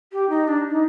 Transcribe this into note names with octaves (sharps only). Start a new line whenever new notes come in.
G4
D#4
D4
D#4